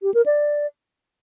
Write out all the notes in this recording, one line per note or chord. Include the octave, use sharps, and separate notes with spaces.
G4
A#4
D5